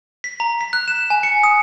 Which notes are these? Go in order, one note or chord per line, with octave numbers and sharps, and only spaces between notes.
B6
A#5
B6
F#6
E7
G#5
C#7
D#6